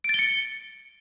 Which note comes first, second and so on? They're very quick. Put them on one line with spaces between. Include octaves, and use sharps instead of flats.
D7 A6 G7 C#7